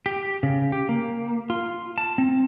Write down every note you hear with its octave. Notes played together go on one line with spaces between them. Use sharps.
G4
C#3
G4
A#3
F4
A5
C4